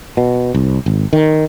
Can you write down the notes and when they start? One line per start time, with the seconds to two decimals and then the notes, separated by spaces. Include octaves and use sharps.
0.17 B2
0.54 C2
0.86 G#1
1.13 D#3